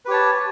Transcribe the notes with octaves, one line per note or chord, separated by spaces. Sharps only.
G4 B4 C#5 A5